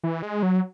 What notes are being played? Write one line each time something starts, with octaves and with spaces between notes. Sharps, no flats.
E3
G#3
F#3